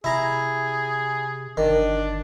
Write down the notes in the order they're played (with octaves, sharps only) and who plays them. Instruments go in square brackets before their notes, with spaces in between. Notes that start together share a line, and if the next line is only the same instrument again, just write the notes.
[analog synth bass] C3 [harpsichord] E4 A#5 [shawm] G#4
[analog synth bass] G1 [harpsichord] D#3 [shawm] D4